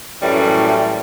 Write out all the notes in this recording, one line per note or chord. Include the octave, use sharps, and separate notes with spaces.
F#2 A2 E3 G3 A3 C#4